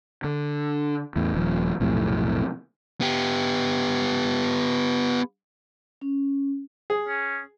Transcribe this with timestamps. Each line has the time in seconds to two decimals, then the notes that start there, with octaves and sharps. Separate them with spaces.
0.24 D3
1.16 E2 A2
1.34 D#1 F3
1.80 B1 F2 A2 C3
3.01 B3 G4
6.01 C#4
6.90 G#4
7.08 C#4